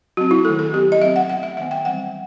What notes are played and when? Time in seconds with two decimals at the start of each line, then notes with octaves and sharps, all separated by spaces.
0.17 F#3 C4 F#4
0.31 E4
0.45 D#3 A3 C4 A4
0.59 A4
0.73 F#3 B3 G4
0.92 D#5
1.01 F#3 A3 C4 E5
1.16 F#5
1.29 F#3 B3 F#5
1.43 E5
1.57 D#3 F#3 B3 E5
1.71 G5
1.85 E3 G3 C4 F#5